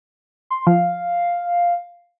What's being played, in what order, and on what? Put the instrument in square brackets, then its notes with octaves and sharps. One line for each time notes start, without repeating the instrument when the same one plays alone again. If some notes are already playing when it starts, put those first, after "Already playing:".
[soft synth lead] C6
[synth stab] F3 [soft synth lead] F5